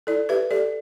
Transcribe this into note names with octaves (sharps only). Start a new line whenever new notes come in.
E4 A4 D5
G4 B4 E5
G4 A4 D5